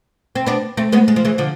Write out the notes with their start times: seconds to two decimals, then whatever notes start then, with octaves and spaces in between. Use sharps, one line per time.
0.35 C4
0.46 B3 D4
0.77 A3 C4
0.92 G#3 B3
1.08 G#3
1.16 F3
1.25 E3 G#3
1.38 D3 F3